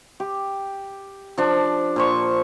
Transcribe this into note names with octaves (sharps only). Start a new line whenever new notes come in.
G4
F3 D4
A#2 C5 C#6